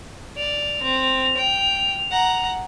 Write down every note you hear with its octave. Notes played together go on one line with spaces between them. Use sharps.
D5 F7
C4
G5
F#5 A#5